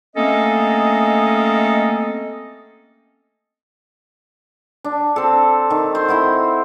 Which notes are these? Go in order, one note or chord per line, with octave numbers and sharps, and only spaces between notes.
A3 A#3 C4 C#4 A4 D#5
D4
C4 A4
D#3
C5
C4 E4 C5 F#5